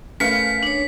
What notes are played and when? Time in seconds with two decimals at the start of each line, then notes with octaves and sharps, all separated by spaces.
0.20 A3 C#4 A#4 B4 F5 B6 C#7
0.63 D4 C#5